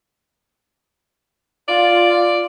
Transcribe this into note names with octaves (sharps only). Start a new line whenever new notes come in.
F4 D5